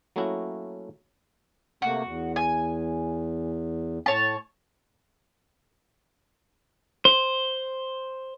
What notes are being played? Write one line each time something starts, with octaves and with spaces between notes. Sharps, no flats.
F#3 A3 A#3 C#4 E4 F#4
C3 A3 A#3 F#4
E2
G#5
A2 C#5 A5
C5